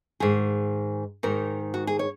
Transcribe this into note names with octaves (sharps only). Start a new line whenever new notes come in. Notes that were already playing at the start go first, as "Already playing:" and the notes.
G#2 D#3 G#4
G#2 D#3 A#4
F#4
G#4
C#5